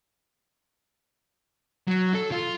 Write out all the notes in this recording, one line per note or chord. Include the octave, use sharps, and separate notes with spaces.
F#3
A4
F4